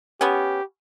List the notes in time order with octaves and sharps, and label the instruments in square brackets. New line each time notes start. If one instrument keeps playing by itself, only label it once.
[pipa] B3 C#4 [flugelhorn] G4